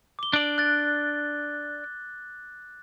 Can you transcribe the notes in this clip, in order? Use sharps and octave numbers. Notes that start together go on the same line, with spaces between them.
D6 G7
D4 D5
F#6 A6